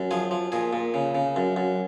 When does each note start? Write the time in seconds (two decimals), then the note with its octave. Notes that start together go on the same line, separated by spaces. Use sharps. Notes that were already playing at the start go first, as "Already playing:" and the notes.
Already playing: F#2
0.11 F3 G#4
0.31 F3
0.52 A#2 G#4
0.73 A#2
0.94 C#3
1.15 C#3
1.36 F#2
1.56 F#2